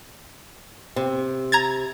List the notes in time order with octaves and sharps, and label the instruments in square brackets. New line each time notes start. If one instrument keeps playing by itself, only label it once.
[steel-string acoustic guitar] C3
[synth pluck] A#5 G#6 A6